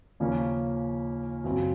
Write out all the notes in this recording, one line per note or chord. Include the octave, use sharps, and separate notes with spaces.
D#2 C#3 F3 A#3 C#4
F#2 C#3 F#3 C4